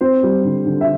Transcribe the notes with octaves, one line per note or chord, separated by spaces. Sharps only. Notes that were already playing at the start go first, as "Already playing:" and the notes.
C4 C5
G3
D3
D3
E5